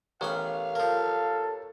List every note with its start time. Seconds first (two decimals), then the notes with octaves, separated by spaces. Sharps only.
0.21 A1 B3 G4 A#4 C#5 F5 B5
0.75 F3 A#3 A4